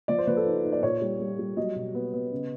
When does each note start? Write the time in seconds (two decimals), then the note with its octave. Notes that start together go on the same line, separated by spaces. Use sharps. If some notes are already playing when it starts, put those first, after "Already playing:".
0.08 F3 D5
0.18 C5
0.27 F3 B4
0.37 A4
0.46 D#4
0.64 D#4
0.72 D5
0.83 A#2 C#5
1.02 G3
1.20 G3
1.39 G3
1.57 F#3 D#5
1.76 B2
1.95 B3
2.14 B3
2.32 C#3